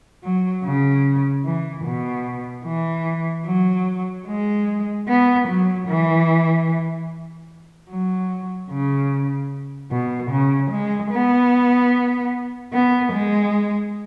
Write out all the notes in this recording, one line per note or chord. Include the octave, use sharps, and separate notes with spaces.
F#3
C#3
E3
B2
E3
F#3
G#3
B3
F#3
E3
F#3
C#3
B2
C#3
G#3
B3
B3
G#3